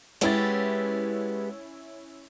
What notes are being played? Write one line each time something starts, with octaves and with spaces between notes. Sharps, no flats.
G#3 B3 C#4 E4 G4 A6